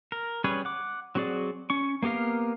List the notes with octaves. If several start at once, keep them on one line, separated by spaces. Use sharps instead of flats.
A#4
G3 C#4 G#4 B4 C#5
F#5 D6
F#3 C4 F#4 G#4 D5
C#4 C#6
A#3 B3 G4 A#4 F5